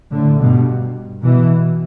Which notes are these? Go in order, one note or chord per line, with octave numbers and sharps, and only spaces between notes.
A2 D3
G2 B2
B2 E3